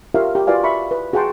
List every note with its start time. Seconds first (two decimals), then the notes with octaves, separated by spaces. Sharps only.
0.14 F4 G4 A#4 C#5 E5 F5
0.35 G4
0.47 F4 F#4 B4 D5 F5 G#5
0.64 E5 B5 C#6
0.91 B4
1.13 F#4 G#4 F#5 G5 A5 C6